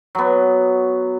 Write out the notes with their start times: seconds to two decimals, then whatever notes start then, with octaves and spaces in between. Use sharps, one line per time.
0.15 F#3 B3